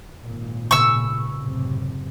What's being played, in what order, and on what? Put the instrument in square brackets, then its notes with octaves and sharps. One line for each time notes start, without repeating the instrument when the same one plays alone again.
[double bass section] G#1 A#2
[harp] C#3 B3 [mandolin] C#6 E6
[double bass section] F#2 A2 C3